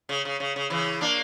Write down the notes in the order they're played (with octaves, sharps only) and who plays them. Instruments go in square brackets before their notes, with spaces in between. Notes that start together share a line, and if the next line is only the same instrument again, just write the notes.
[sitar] C#3
C#3
C#3
C#3
C#3 E3
A#3 D4